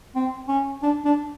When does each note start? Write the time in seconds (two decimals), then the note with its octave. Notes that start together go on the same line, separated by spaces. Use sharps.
0.15 C4
0.48 C#4
0.83 D4
1.05 D4